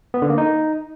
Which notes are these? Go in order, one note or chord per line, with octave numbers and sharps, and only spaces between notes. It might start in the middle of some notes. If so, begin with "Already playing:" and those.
B3
D3
A#3
D#4